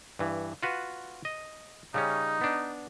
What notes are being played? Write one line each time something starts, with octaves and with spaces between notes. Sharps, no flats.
G2 E3
F4 F#4 B4
D#5
C#3 G3 C#4 D#4
B3 D4